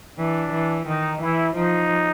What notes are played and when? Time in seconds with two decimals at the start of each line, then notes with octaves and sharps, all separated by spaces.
0.18 E3 D4
0.52 E3
0.87 D#3 D#4
1.21 E3 E4
1.55 F3 D#4